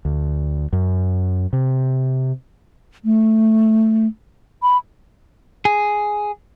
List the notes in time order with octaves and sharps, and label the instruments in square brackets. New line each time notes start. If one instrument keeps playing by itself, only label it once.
[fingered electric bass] D2
F#2
C3
[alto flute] A3
B5
[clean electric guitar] G#4